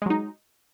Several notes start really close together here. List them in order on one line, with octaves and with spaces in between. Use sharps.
G#3 F#3 D#4